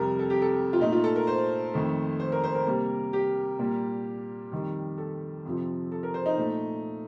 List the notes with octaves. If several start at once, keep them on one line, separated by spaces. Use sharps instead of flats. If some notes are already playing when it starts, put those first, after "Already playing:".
Already playing: F2 C3 G3 A#4
A4
G4
A4
F4
A#2 A3 D#4
F4
A4
A#4
C5
F2 D#3 A3
C5
A#4
C5
A#4
C3 G3 A#3
G4
A#2 G3 A#3
F2 D#3 G3
A4
F2 C3 F3
A4
A#4
C5
D#4
A#2 A3